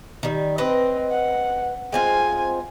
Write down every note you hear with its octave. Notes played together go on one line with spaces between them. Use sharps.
D#3 G3
C4 B4 D#5
F#5
G#3 C4 F4 G#5